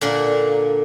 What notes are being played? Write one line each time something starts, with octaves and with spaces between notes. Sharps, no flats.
A#2 D3 A#3